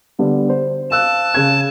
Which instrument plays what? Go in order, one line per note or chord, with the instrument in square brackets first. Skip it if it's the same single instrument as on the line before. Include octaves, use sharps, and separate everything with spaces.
[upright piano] D3 G3 B3
C5
[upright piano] F5 E6 F#6 [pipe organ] A5
[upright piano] C#3 G#6